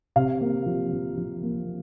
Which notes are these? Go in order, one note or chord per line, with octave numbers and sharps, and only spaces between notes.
C3 F5
A#3
F3
F3
F3
A#3